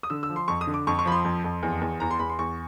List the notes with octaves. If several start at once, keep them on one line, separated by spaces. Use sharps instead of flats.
D#6
D3 E6
E6
F3
C6
F2 C#6
D#6
D3
D6
F2 C#6
C#6
F3 B5
C6
F2
F2
E2
E2
E2 A#5
C6
E2 B5
C6
E2 C#6